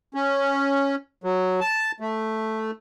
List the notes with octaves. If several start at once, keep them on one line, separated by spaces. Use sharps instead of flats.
C#4
F#3
A5
A3